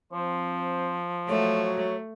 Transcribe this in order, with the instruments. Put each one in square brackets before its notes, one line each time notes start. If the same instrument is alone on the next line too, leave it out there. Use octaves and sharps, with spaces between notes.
[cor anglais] F3 [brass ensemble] C4 C5
[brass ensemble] F#3 [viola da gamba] A3 [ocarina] C#5